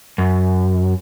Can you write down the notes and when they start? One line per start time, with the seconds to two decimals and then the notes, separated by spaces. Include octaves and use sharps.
0.18 F#2